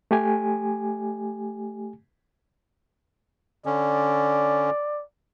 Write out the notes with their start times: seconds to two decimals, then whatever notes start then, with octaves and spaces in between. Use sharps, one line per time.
0.11 A3 G4 G#5
3.66 D3 C#4 D5